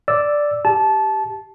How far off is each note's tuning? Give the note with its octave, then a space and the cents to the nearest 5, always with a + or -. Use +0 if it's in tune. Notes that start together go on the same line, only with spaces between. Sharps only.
D5 +0 E6 +0
G4 +0 A5 -20